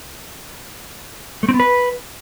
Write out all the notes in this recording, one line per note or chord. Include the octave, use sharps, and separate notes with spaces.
A3
C4
B3
B4